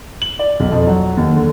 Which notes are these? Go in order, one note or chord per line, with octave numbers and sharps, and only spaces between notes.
F#7
D5
B1
F2
F#3
D#2
D3